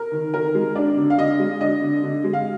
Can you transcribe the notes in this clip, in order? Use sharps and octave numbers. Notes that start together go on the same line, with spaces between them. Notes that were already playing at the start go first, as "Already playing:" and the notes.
Already playing: A#4
D#3
D#3 A#4
G#3
D4 D5
D3
F5
D3 D#5
G#3
D4 D#5
D3
D3
G#3
F5